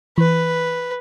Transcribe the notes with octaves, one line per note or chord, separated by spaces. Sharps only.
E3 B4